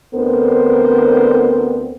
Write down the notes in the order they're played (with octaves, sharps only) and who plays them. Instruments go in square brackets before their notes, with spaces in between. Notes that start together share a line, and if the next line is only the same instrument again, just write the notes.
[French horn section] D2 D3 B3 C4 A#4 C5